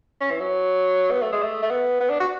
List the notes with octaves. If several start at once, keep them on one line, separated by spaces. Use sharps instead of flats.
C#4
E3
F#3
B3
A3
G#3
A3
A3
B3
B3
D4
F#4